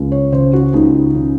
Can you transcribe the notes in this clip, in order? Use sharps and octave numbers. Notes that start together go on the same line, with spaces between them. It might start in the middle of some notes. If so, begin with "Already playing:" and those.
Already playing: C#2
C#5
C#3 C5
F#4
C#2 D#4
C#3